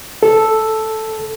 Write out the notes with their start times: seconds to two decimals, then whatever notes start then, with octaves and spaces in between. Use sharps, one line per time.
0.23 A4